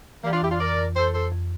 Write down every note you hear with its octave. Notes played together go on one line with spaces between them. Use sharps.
E3 G3 A#3
D4 F4
F2 E4 G4
D4 F4
F2 A#4 D5
F2
F2 A4 C5
F2 A4 C5
F2